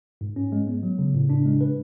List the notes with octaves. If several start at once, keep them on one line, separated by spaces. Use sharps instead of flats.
G#2
C#4
G#3
B3
F#3
C#3
A2
D4
G#3
B4